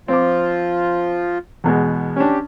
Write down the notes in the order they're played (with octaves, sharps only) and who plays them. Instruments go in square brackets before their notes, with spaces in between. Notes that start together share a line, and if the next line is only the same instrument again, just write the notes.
[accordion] F3 F4 [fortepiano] C4 D6
[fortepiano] E2 B2 G#3
[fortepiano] C#4 D4 [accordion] G4